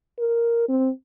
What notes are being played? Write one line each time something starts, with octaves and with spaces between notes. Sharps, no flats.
A#4
C4